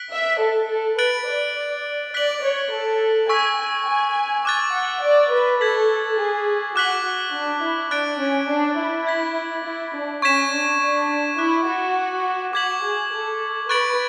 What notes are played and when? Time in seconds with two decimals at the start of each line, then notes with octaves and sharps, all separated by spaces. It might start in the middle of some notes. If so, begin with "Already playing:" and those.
Already playing: F#6 B6 D7 F#7
0.12 E5
0.40 A4
0.69 A4
0.99 B4 F#6 A6 D7 F#7
1.27 D5
2.14 D5 F#6 B6 F#7
2.43 C#5
2.72 A4
3.29 G#5 C#6 E6 B6
3.58 G#5
3.87 G#5
4.45 G#5 D6 F#6 A6
4.74 F#5
5.02 D5
5.32 B4
5.61 A4 G#6 B6 F#7
6.19 G#4
6.76 F#4 D6 F#6 B6 F#7
7.06 F#4
7.34 D4
7.63 E4
7.91 D4 F#6 A6 D7
8.20 C#4
8.50 D4
8.78 E4
9.07 G#6 B6 F#7
9.64 E4
9.94 D4
10.22 C#4 C#6 G#6 B6 E7
10.51 D4
10.80 D4
11.38 E4 D6 F#6 B6
11.67 F#4
12.53 F#4 D6 G#6 B6 F#7
12.82 G#4
13.12 A4
13.69 B4 C#6 F#6 A6 D7 F#7